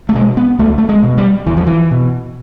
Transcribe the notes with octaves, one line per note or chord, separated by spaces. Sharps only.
A3
B2 G#3
B3
C#2 A3
A3
G#3
B2
G3
E2 E3
F3
E3
B2